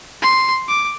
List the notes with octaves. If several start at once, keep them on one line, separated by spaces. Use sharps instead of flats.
C6
D6